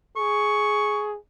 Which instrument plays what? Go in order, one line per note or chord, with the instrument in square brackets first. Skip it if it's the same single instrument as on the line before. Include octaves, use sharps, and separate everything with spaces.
[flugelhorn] G#4 [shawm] C#6